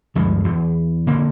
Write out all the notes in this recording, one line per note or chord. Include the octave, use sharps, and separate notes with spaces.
D2 G2 F3 G#3
E2
D3 A#3 C4